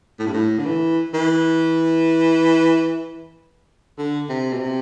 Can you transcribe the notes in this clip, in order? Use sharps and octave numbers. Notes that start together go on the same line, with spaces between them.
A2
G2
A2
D3
E3
E3
D3
C3
B2
C3